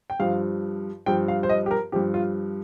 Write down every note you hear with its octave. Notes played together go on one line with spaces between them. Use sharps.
G5
G2 F3 F5
G2 F3 G5
F5
C5
D#5
G4
A#4
G2 F3 G4
F4